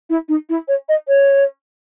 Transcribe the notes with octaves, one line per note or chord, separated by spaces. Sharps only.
E4
D#4
E4
C#5
D#5
C#5